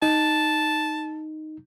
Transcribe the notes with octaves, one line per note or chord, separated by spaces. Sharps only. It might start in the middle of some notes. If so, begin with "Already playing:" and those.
D#4 A5